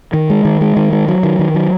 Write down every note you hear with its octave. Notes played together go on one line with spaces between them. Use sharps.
D#3
G#3
D#3
G#3
D#3
G#3
F#3
D#3
D#3
F#3